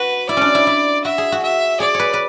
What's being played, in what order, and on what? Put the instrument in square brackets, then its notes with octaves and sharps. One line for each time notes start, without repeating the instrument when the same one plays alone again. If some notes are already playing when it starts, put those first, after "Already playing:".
Already playing: [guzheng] F#4 [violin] B4
[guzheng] E4 [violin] D5
[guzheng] C#4 D4
E4
E4
[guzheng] F#4 [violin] E5
[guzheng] G#4
F#4
[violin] E5
[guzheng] G#4 [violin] D5
[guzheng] B4 C#5
B4